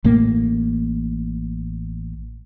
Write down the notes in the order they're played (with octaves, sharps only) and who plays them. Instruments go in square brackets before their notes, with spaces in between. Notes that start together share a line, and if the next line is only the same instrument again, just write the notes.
[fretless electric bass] A1 A2 A3 A#3